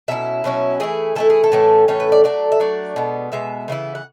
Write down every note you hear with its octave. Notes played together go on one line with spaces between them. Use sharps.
B2 F#3 C#4 E4 E5
B2 F#3 C#4 E4
E3 A3 E4 G#4
E3 A3 E4 A4
G#4
A4
A2 E3 A3 C#4
A2 E3 A3 C#4 C#5
B4
D5
F#3 A3 D4 D5
E5
F#3 A3 D4 D5
B2 G#3 B3
B2 G#3 B3 E5
C#3 E3 B3 E4
F#5